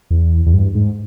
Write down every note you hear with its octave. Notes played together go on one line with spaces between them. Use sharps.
E2
E2
G2
G#2